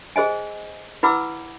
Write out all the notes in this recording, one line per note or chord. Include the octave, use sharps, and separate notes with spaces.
G#4 C5 D#5 G#5
E4 B4 F#5 B5 D6 E6